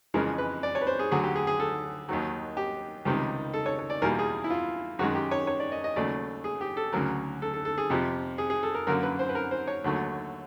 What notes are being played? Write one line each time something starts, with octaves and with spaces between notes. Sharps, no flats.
F2 C#3 E3 G#3 A#4
B4
D5
C#5
B4
C5
G#4
D2 D3 F#3 G#4
G4
G#4
G#4
A4
D#2 D#3 F#3
G4
C#2 C3 D#3 G3 G4
A4
C#5
C#5
D5
E2 B2 G3 A#3 A#4
G#4
E4
F4
F#2 D#3 G#3 F#4
G4
C#5
C#5
D5
D#5
D#5
D#2 C#3 F#3 A3 D5
G#4
G4
A4
D2 C#3 F#3 A#4
A4
A4
A4
G#4
F2 C3 F3 G4
G#4
G#4
A4
A#4
F#2 D3 F#3 A#3 A#4
B4
C5
B4
A#4
C5
C#5
D#2 D3 F#3 A3